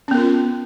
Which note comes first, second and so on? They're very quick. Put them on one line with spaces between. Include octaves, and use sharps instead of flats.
C#4 B3 A#4 F4